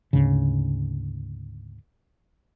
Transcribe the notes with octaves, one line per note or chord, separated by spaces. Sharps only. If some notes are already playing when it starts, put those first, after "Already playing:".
D2 G#2 C#3